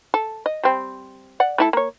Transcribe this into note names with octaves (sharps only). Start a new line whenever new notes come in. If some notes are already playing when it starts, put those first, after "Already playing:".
A4
D#5
G3 C4
D5 F#5
A3 E4 A4
A#3 C#5